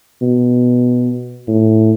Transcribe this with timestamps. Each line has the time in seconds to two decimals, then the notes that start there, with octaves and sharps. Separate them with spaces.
0.22 B2
1.48 A2